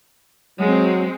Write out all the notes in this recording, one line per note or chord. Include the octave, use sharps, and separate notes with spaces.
F#3 G#3 C4